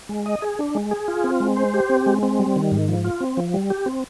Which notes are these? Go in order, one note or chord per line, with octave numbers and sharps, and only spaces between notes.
G#3
D#5
G#4
D4
G#3
G#4
F4
C4
G#3
C5
G4
C4
G#3
C4
G3
D#3
G#2
F3
F4
C4
F3
G3
G4
C4